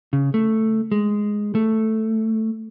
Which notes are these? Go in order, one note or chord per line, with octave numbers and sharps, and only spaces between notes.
C#3
A3
G#3
A3